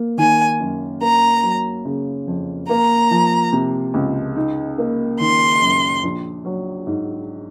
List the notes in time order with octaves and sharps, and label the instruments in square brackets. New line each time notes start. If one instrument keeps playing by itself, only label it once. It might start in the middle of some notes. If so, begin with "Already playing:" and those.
Already playing: [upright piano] A#3
[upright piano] D#3 [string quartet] G#5
[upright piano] F#2
[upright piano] A#3 [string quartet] A#5
[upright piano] F#3
C#3
F2
[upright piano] A#3 [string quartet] A#5
[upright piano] F3
C3
C#2
D#4
A#3
[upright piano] D#3 [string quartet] C6
[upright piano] F#2
A#1
F#3
G#2